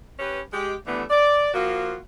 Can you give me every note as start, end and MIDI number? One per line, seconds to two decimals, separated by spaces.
0.19 0.41 61
0.19 0.41 67
0.19 0.41 71
0.53 0.75 56
0.53 0.75 67
0.87 1.03 50
0.87 1.03 52
0.87 1.03 55
0.87 1.03 57
0.87 1.03 59
1.10 1.50 74
1.54 1.95 53
1.54 1.95 58
1.54 1.95 65
1.54 1.95 66